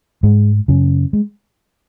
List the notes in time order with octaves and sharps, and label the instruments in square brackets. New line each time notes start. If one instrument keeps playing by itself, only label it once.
[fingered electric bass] G#2 G#3
F#2 C#3
G#3